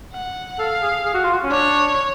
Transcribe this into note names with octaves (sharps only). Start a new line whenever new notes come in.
F#5
A4 F5
G#4
G#4
F#4
F4
F#4
C#4
D4 C#5